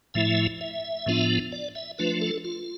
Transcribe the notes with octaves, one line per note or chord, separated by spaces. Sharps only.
A2 F3 A3 E4 E5
E5
A2 F3 B3 D4 F4
D5
E5
F3 A3 D4 F4 B4
A4
F4